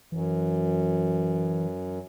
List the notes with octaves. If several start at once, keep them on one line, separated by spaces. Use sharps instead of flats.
F#2 E3